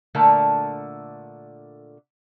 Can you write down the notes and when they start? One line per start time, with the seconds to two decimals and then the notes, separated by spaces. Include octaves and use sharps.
0.15 A#2 D3 A3 A4 A#4